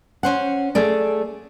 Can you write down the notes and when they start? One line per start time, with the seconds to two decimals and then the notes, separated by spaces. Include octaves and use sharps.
0.23 C#4 C5 F#5
0.75 A3 G#4 D5